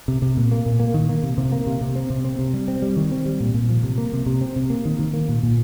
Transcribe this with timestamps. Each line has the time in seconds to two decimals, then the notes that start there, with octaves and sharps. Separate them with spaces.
0.08 C3
0.22 C3
0.37 A#2
0.51 A#3
0.66 A#2
0.80 A#3
0.94 D#3
1.09 A#3
1.23 C3
1.38 C3
1.52 A#3
1.67 C3
1.81 C3
1.95 C4
2.10 C3
2.24 C4
2.39 C3
2.54 G3
2.68 C4
2.82 G3
2.96 D#3
3.12 C4
3.26 G3
3.40 A#2
3.54 A#2
3.69 F3
3.83 C3
3.98 A#3
4.13 C3
4.26 C3
4.41 C4
4.56 C3
4.70 A#3
4.85 D#3
4.99 D#3
5.14 A#3
5.29 A#2
5.43 A#2